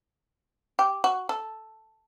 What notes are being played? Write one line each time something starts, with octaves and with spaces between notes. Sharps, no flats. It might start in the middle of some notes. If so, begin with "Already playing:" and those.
G4
F#4
A4